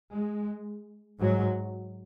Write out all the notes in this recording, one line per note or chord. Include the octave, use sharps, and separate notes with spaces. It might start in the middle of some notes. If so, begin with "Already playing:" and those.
G#3
G#2 F#3